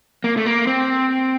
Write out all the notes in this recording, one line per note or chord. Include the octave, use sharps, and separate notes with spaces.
A#3
A3
A#3
C4